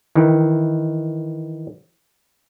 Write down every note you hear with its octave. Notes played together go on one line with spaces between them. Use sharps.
D#3 E3